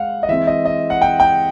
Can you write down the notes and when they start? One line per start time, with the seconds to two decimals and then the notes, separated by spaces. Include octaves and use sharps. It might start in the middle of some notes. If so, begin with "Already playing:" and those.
Already playing: G#3 F5 F#5
0.23 D#5
0.29 E3 G#3 C4 E5
0.47 D#5
0.65 D#5
0.90 F#5
1.02 G5
1.20 G5